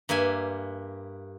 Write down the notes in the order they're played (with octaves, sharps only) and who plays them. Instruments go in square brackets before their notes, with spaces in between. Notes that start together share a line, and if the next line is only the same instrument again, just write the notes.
[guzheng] G2 A#3 E5 G#5